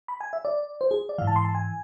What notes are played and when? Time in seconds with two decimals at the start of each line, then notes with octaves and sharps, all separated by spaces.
0.08 B5
0.20 G#5
0.33 E5
0.45 D5
0.81 C5
0.91 G#4
1.09 D5
1.18 G#2 E3 F5
1.27 A5
1.36 C6
1.45 A5
1.55 G#5